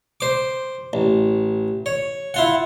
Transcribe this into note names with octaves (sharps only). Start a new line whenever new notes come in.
C5 D6
A1
C#5
E4 F4 F#5